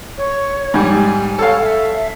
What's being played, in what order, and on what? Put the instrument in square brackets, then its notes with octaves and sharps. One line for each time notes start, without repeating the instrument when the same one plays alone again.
[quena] C#5
[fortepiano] G#2 G3 [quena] G#5
[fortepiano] A4 F5 [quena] C#5
[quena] E5